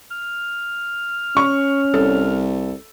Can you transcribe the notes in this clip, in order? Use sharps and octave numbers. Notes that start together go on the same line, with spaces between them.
F6
C#4 C#6
C2 A4